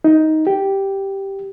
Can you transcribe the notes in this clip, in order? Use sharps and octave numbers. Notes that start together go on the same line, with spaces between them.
D#4
G4